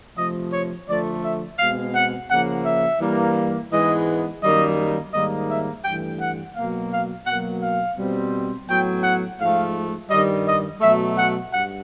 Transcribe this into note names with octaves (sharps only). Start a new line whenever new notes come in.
C3 F3 A3 D#5
C#5
D3 F3 A3 D5
E5
B2 G#3 C4 F5
F#5
C#3 F3 A#3 F#5
E5
G2 E3 G3 A#3
G#2 E3 G#3 B3 D#5
F#2 D#3 G3 A#3 D#5
G#2 D#3 G3 A#3 D#5
E5
G2 E3 A3 G5
F#5
B2 F#3 A#3 F5
F5
B2 F#3 A#3 F#5
F5
B2 G3 C4
A2 F#3 B3 G5
F#5
G#2 F3 A3 F5
G2 D#3 G3 D#5
D#5
B2 F#3 A3 E5
F#5
G2 F#5